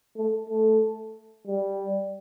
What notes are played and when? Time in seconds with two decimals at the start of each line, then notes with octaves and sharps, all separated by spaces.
0.17 A3
0.50 A3
1.47 G3